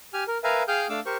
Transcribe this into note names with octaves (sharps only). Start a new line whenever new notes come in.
G4 G#5 F6
A#4
A#4 B4 E5 F5 G#5 A#5
G#4 F5 G5 D#6 F6 G6
A3 D4 F5 D6 E6
G4 A#4 C5 C#6